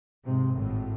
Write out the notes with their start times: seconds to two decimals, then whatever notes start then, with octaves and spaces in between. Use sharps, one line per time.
0.24 G#2 C3
0.53 G#1 A2